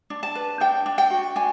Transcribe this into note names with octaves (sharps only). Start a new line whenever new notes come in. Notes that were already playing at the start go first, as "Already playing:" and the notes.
D4
A5
B4
D4 G5
D4
G5
F#4
D4 G#5